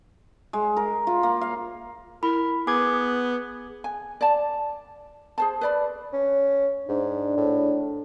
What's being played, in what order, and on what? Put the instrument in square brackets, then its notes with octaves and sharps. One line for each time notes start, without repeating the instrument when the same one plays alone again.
[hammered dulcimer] G#3
A#4
F4
A#3
F5
[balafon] E4 [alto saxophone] A#4 [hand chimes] B5
[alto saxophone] B3 [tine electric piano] G#4 G#6 [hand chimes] D6
[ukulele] G#5
D5 A5
G#4 C5 A5
B4 D5 B5
[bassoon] C#4
[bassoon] G#2 [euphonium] D4
[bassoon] A2